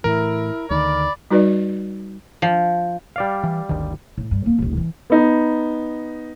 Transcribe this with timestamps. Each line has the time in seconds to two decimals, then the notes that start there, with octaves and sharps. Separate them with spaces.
0.04 A2 E3 E4 A#4
0.70 D2 D3 D#3 D5 B5
1.31 G3 D#4 F#4 B4 D5
2.42 F3
3.16 G3 D5 F5
3.44 E3
3.69 G1 D2 D#3
4.18 A2
4.31 G2
4.46 A#3 C4
4.59 D#1 A1
4.77 E3 D4
5.10 B3 D#4